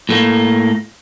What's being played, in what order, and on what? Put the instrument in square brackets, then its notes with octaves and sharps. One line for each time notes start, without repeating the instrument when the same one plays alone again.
[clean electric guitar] A2 A3 A#3